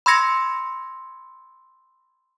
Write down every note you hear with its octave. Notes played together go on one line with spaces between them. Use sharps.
B5 C6 E6 G#6 A#6 C#7